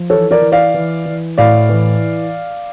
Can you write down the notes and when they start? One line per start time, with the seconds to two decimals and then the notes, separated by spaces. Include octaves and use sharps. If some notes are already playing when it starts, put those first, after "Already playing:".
Already playing: F3
0.10 E3 A4 C#5
0.31 A#4 D5
0.41 E3
0.52 D5 F5
0.74 E3
1.05 E3
1.38 A2 D5 F5
1.69 E3